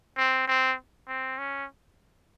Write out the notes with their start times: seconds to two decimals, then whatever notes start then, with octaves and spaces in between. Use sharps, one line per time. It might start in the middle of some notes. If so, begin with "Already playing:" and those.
0.18 C4
0.47 C4
1.08 C4
1.38 C#4